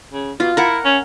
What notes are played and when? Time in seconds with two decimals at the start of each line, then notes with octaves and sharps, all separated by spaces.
0.13 C#3
0.40 B2 F4
0.57 E4 A#4 F#5
0.85 C#4